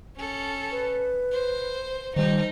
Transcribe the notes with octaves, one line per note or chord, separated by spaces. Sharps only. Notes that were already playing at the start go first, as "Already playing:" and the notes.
C#4 A4
B4
C5
D#3 G3 D#4 C5